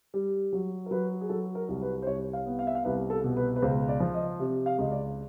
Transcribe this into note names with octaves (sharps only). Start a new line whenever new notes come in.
G3
F#3
A#4
F#3 B4
G#4
F#3 A4
A#4
C2
B4
C5
C2 C#5
F5
B3
F5
E5
F5
C2 B4
A4
B2
B4
B4
C#2 C5
D5
F3
D#5
C3
F5
C#2 D#5
D5